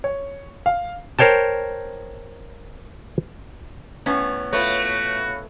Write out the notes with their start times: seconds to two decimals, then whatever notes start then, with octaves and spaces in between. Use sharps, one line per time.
0.04 C#5
0.66 F5
1.19 A#4 C5 C#5 G5 A5
4.06 A2 B3 C#4
4.53 A3 F4 F#4 B4 C#5